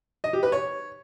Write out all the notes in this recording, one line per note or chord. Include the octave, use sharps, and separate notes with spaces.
D#5
G4
B4
C#5